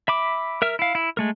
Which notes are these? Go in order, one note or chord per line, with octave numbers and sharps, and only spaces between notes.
E5 B5 D6
A#4 E5 F6
E4 F5
E4
G#3 A3 A#4